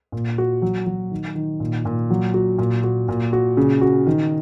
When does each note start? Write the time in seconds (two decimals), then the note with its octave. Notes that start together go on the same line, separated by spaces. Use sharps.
0.12 A#2
0.38 F#4
0.62 F#3
0.86 F#3
1.11 D#3
1.35 D#3
1.60 A#2
1.85 A#2
2.10 F#3
2.34 F#4
2.58 A#2
2.84 F#4
3.09 A#2
3.33 F#4
3.57 C#3
3.82 F#4
4.07 D#3